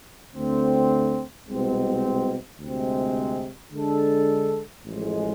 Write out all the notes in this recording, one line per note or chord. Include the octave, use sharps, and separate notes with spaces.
D2 D3 A3 C4
C2 B2 G#3 C4
D2 C3 G#3 C4
D3 G#3 D4 A4
A1 A2 F3 G#3